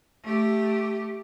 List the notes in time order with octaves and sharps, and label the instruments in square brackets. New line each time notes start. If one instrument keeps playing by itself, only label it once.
[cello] A3 G4